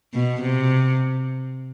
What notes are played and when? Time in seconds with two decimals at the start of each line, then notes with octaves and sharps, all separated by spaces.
0.14 B2
0.42 C3